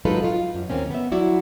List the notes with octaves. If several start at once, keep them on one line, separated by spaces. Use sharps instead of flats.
F#3 G#3 D#4 F4 A4 B4
F4
F#2
D#2 A#3 C4 C#4
B3 E5
F#3 E4 F#4 D5